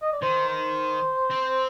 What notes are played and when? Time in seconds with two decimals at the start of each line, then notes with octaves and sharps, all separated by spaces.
0.02 D#5
0.12 D5
0.22 D#3 C5
0.49 C5
1.31 C4